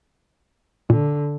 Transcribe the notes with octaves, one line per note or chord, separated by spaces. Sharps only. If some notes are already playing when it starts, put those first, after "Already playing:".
A#2 D3